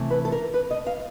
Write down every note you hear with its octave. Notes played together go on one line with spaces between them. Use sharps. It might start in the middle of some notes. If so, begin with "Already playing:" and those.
Already playing: C3 E3 A3
B4
A4
A#4
B4
D#5
F5